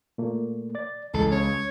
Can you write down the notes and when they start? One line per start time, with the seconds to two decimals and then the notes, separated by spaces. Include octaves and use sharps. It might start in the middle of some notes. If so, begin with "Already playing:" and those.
0.18 A#2 A3 A#3
0.75 D5 A6
1.14 C#2 E3 A4
1.32 C#4 C#5